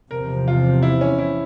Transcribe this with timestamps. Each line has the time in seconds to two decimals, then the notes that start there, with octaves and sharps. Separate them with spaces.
0.11 E2 C3 F3 A#4
0.48 F4
0.82 E4
1.01 C#4
1.19 E4